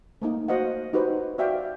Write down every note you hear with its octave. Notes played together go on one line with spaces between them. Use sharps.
A3 A#3 D#4
F#4 C5 D#5 F5 F#5
D#4 F#4 G4 B4 C5
F#4 D5 E5 F5 G5